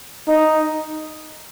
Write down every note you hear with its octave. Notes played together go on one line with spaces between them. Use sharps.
D#4